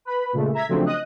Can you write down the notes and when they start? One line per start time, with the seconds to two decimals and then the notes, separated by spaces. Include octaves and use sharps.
0.05 B4 B5
0.33 A#2 C#3 G#3 A3
0.53 E5 A#5 G#6 B6
0.69 C#3 F3 F#3 A3 C4 D4
0.86 D#5 D#6 F#6